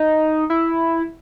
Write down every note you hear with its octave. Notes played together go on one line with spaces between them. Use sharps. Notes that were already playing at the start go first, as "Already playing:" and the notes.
Already playing: D#4
E4